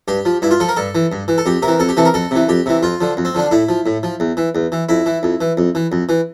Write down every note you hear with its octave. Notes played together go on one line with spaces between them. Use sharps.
G2 G4
F3
G2 E4
F4
F3 A4
A#4
G2 A4
E3
G2
E3
A4
F2 G4
C3 A#4
E3
F2 A4
G4
C3 E3 A4
A#4
F2 A4
C3 E3
F2 G4
C3 E3
F2 F4
D3 F3
F2
C4
D3 F3 D4
A2 E4
F3
A2
F3
E2
E3
E2
E3
F2 E4
E3
F2
E3
F2
E3
F2
E3